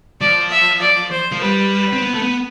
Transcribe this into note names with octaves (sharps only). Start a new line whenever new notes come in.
F3 D5
E5
D5
C5
F3
G3 B4
C4
B3
A3
B3